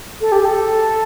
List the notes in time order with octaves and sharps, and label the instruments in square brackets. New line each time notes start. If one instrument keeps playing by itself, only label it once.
[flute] A4
G4
A4